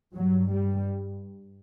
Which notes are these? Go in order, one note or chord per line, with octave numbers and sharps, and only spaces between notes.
G2 F#3
G3